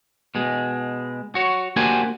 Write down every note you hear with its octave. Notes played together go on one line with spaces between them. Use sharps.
B2 G#3
F#4 C#5
A#3 D4 F#4 G4 C5 G#5